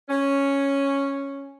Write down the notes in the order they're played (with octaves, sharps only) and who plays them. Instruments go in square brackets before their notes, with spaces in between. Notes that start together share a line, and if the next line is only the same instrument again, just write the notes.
[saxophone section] C#4